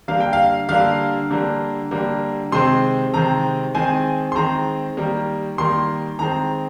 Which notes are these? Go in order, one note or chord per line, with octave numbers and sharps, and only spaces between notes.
D3 G3 A#3 F5
G5
F5
D3 G3 A#3 F5
D3 G3 A#3
D3 G3 A#3
C3 D#3 G#3 C4 C6
C3 D#3 G#3 C4 A#5
D#3 G#3 C4 G#5
C6
D#3 G#3 C4 A#5
D#3 G3 A#3
D#3 G3 A#3 C6
D#3 G#3 C4 A#5